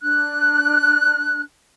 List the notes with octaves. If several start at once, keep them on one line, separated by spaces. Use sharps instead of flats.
D4 F#6